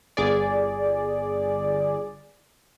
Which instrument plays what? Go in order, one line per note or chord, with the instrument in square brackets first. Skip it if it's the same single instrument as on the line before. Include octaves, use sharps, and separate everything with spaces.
[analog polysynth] G1 G#4 D5